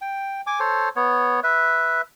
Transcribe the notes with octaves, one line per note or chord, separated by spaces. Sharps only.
G5
G#5 D6
A4 C5 C#5
B3 C#5
B4 E5